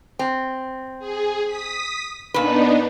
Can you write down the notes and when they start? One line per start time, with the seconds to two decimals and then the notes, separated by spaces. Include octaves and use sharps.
0.19 C4
0.99 G#4
1.46 D#6 B6
2.34 A#2 B3 D4 D#4 B4